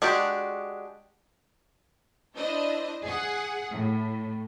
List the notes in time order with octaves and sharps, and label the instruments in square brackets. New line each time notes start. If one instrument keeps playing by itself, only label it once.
[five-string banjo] G#3 D4 F#4 G4
[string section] D4 E4 C5 D#5
G#4 F#5
A2